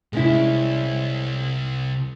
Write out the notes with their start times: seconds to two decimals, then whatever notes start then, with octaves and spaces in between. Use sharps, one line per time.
0.13 C2 G#3 C#4 E4